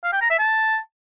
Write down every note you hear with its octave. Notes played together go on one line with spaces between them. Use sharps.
F5
G5
A#5
E5
A5